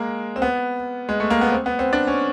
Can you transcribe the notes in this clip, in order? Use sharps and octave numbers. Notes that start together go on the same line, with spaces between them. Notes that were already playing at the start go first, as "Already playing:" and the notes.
Already playing: G#3 A#3
C4
B3
G#3
A3
A#3
B3
C4
B3
C4
D4
C#4